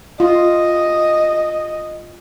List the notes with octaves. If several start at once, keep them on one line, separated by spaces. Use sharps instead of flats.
F4 D#5